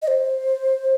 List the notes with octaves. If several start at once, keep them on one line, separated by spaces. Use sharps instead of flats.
D#5
C5